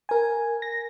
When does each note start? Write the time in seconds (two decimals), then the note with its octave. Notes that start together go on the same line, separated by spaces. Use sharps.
0.09 A#4 G#5
0.62 A#6